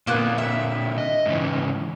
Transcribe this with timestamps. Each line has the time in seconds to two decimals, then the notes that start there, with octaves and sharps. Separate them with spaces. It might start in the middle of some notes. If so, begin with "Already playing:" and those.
0.07 A#2 D3 A#3 B3 F#6
0.38 E5
0.98 D#5
1.26 G#2 C#3 E3